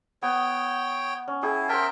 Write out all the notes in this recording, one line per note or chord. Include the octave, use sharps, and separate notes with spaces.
B3 C#5 G5
C#4
E4 G#4 G5
A#4 C5 E5 G5 A5